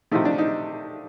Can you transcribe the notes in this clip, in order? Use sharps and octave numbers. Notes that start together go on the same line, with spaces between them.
C3 F3 A3 D#4
D4
D#4